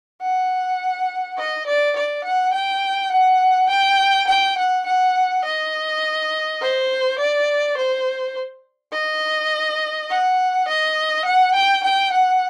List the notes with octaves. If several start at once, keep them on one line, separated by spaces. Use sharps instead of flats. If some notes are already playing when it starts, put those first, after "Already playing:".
F#5
D#5
D5
D5
F#5
G5
F#5
G5
G5
F#5
F#5
D#5
C5
D5
C5
D#5
F#5
D#5
F#5
G5
G5
F#5